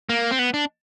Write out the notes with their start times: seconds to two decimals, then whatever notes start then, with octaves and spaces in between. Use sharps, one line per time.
0.09 A#3
0.31 C4
0.39 B3
0.54 D4